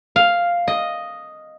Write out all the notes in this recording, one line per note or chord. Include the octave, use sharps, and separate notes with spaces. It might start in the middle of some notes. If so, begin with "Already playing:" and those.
F5
D#5